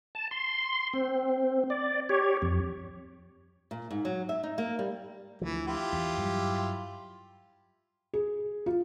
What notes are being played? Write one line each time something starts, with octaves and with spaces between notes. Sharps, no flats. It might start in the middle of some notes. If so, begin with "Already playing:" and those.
A5
C6
C4
D5
G4 C#5
F2
A#2
G#2
F#3
E5
D#4
A#3
G3
D2 E3 F3
E4 F4 G4
E2
G2 F#3 G3
G#4
F4